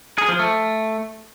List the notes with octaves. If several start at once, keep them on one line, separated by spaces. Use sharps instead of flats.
G#4
F3
A3